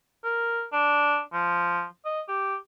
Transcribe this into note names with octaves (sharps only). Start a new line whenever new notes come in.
A#4
D4
F3
D#5
G4